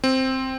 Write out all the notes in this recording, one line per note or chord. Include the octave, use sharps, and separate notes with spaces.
C4